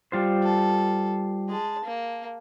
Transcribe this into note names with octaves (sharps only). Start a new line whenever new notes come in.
G3 F4 C5
A4
G#3 A5
A#3